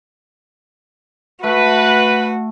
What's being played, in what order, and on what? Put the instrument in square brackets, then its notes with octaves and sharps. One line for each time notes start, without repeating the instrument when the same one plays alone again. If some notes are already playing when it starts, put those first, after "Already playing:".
[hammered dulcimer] A3 [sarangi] F#4 [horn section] B4